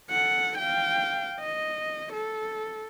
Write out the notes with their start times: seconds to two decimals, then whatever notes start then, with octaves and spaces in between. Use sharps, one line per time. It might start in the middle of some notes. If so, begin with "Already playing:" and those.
0.11 A4 F#5
0.59 F5 G5
1.41 D#5
2.14 A4